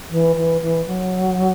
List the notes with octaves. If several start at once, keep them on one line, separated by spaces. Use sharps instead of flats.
E3
E3
E3
F#3